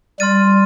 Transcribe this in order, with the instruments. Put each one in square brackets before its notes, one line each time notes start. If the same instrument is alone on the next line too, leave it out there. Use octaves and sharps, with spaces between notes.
[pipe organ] G3 [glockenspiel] C6 F6 A6 D#7